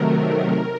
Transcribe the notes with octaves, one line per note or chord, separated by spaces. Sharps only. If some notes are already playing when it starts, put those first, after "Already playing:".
Already playing: C3 D#3 F#3 A3 A#4